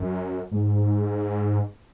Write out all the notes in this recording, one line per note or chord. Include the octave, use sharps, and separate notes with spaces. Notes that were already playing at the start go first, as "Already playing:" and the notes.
Already playing: F#2
G#2